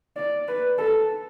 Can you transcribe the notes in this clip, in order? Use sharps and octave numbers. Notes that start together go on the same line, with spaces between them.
D5
B4
A4